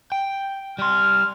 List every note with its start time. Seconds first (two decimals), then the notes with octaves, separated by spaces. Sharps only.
0.12 G5
0.79 G3 C6 F6